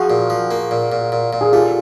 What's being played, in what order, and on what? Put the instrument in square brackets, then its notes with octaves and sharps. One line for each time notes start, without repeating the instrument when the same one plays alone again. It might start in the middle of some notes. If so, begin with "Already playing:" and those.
Already playing: [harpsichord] F3 [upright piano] F#4 G#4
[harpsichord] A#2
F3
A#3
A#2
A#2
A#2
A#2
[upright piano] G#4
[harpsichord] A3 [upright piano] F4 G4